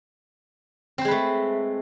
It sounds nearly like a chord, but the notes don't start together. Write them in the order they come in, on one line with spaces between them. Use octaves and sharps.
C4 C5 G#3 B4 A3